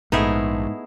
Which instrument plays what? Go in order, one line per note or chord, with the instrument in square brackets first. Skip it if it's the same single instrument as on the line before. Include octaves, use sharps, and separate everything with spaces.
[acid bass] A#1 [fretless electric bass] G#2 [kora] A3 B3 [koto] D#4 E4 G#4